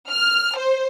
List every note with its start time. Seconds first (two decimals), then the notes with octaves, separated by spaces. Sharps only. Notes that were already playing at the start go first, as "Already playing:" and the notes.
0.10 F6
0.56 C5